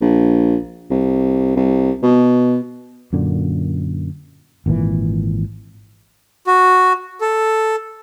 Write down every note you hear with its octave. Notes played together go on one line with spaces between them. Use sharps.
A#1
C2
C2
B2
F#2 A#2 D3
G#1 A#2 D3 E3
F#4
A4